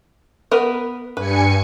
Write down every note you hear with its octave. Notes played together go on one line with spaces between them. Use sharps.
B3 A#4 B4
G2 B4 G#5 C#7